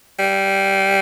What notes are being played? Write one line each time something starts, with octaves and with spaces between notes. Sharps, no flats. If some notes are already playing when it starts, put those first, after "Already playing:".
G3